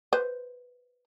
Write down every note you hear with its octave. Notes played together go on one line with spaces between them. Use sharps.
B4 C5